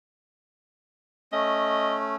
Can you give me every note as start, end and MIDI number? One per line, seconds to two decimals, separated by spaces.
1.32 2.16 57
1.32 2.16 61
1.32 1.97 75